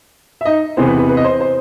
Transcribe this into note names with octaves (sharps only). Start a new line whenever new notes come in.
E5
D#4 D#5
E2 C3 E3 B3 C5
B4
B4
B4
D#5
C5
C5